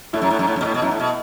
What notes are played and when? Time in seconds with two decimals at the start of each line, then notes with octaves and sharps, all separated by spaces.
0.13 A2 E4
0.22 F#2
0.31 A2
0.39 F#2
0.47 A2
0.56 F#2
0.61 B2
0.65 A2
0.74 B2
0.82 F#2 E4
0.91 A2
1.00 B2